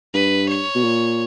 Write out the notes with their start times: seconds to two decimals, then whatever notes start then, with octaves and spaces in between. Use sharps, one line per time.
0.13 G2 B4
0.48 C#5
0.75 B2
0.83 A#2